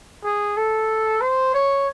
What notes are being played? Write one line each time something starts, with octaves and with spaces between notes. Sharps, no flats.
G#4
A4
C5
C#5